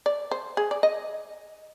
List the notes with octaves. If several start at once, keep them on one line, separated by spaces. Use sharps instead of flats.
D5
C5
G#4
D5
D#5